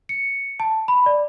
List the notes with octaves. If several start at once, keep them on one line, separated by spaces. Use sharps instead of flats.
C#7
A5
B5
D5